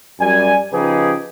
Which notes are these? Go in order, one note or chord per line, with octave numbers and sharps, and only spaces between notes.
F#2 G3 D5 G#5
C#3 F3 D#4 G4 G#4 B4